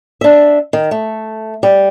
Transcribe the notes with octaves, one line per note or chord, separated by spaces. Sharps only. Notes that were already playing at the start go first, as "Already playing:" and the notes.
D4 E5
D#3
A3
G3